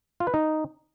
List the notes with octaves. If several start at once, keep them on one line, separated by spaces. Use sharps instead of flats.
F4
B4
D#4